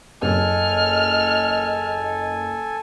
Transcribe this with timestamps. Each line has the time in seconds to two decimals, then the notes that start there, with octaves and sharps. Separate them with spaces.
0.22 F#1 A4 D#5 G#5 F6